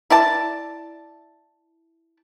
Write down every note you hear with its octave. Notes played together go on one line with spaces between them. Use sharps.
E4 D5 A5